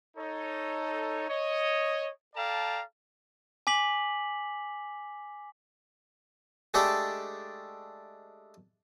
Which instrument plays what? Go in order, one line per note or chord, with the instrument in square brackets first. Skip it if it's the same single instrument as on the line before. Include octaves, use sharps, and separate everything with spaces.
[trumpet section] D#4 A4 C#5
C#5 D#5
A4 D5 F5 G5 A5 A#5
[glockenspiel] G#5 D6 B6 F#7
[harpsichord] G#3 A3 D4 G4 A4